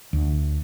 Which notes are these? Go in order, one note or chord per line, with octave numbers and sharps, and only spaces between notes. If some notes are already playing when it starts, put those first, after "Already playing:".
D2